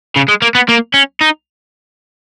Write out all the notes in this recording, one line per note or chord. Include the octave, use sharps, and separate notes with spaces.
C#3
G#3
A#3
B3
A#3
C#4
D#4